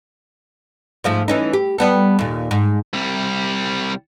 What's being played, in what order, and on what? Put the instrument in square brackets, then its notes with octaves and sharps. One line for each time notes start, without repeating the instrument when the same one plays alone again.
[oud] G#2 F3 A3
E3 C#4 D#4
G4
G3 B3 A4
D#2 A#2
G#2
[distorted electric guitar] C2 G3